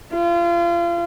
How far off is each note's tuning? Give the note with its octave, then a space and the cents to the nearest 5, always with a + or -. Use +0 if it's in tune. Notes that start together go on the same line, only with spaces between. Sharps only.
F4 -30